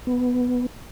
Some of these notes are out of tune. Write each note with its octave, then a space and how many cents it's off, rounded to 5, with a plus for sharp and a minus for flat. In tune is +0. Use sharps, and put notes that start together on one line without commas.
B3 +5